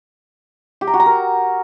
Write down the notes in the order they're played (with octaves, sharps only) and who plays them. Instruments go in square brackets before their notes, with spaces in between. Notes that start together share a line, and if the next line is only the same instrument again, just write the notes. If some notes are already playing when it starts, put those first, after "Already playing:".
[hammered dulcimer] G4
A#5
F#4
A#5
A#4